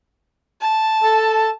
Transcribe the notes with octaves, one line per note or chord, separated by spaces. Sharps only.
A5
A4